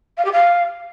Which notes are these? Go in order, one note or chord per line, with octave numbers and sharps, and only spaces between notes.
F5
G4
F5